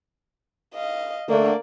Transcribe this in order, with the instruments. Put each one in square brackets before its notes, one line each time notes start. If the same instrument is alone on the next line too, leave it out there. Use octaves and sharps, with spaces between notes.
[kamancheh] D#5 F5
[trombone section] D3 A3 [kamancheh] A#3 D5